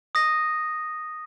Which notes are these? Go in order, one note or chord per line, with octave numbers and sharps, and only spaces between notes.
D#6 A#6 D#7